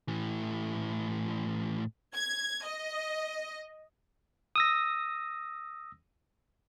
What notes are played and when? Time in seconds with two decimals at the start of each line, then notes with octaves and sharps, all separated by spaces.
0.08 A2 E3
2.14 G#6
2.64 D#5
4.56 D#6 E6 A#6